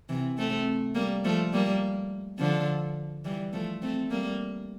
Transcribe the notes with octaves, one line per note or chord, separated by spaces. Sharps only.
C3 E3
A3 C4
G3 A#3
F3 A3
G3 A#3
D3 F3
E3 G3
F3 A3
A3 C4
G3 A#3